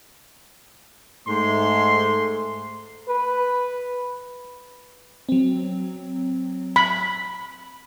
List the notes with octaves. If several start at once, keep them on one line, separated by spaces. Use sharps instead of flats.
G#2 A3 C6
B4
F#3 C4
B5